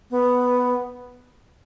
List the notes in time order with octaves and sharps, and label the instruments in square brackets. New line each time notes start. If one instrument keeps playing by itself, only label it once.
[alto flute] B3